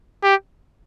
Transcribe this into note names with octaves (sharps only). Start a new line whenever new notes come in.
G4